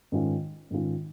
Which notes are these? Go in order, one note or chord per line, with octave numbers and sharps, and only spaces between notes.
G#2 D#3 C#4 F4
G#2 D#3 C#4 F4